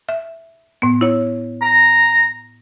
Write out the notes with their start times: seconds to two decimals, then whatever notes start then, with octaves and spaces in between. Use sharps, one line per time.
0.09 E5
0.82 A2 B3
1.01 E4 C#5
1.62 A#5